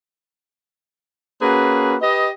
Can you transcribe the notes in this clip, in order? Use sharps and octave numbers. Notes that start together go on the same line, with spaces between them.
A#3 C#4 F#4 G#4 B4
G4 B4 D#5